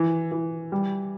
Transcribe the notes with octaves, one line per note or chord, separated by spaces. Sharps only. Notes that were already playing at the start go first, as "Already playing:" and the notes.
Already playing: E3
E3
G3